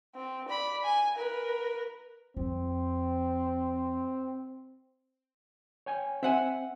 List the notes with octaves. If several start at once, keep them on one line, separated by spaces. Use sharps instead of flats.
C4
D5 B5
G#5
A#4 B4
F2 C4
C#5 G5 G#5
C4 E5 F#5 G#5